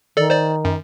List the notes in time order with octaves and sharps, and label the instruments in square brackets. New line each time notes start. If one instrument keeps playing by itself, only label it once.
[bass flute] D#3 [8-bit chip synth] A4 D5
[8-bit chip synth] C5 D5
F#2